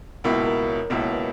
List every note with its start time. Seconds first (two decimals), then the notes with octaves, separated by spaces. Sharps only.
0.24 C#2 B2 A#3 E4 A#4
0.47 A#4
0.68 C#5
0.90 C#2 B2 A#3 E4
1.02 C#5
1.12 B4